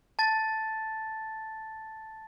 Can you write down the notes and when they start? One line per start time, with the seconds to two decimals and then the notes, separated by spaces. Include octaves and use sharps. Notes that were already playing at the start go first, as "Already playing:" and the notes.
0.19 A5 A6